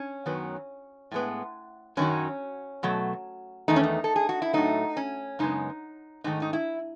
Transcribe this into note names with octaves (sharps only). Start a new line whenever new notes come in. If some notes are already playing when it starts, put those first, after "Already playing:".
Already playing: C#4
F#2 D#3 F#3 B3
A2 G#3 B3
F#2 D#3 F#3 C#4
B2 F#3 A3
E2 D#3 A3 D#4
C#4
D#4
A4
G#4
F#4
E4
A2 F#3 A3 D#4
C#4
F#2 C#3 G#3 B3 D#4
G#2 D#3 A3 D#4
D#4
E4